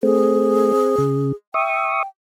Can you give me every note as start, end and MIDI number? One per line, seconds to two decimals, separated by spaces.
0.03 0.72 57
0.03 0.72 60
0.03 1.34 68
0.73 0.96 60
0.98 1.32 49
1.54 2.03 76
1.54 2.07 79
1.54 2.03 85
1.54 2.03 87